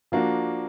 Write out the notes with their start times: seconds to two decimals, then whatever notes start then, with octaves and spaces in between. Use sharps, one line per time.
0.12 F3 A#3 D4 F#4